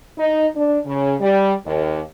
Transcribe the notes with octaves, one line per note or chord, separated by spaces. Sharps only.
D#4
D4
C#3
G3
D#2